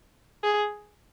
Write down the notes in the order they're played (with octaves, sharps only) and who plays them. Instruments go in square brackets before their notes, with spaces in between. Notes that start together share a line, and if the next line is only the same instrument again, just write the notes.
[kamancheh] G#4